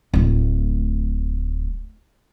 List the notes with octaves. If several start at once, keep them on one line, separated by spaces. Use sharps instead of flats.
D1 A3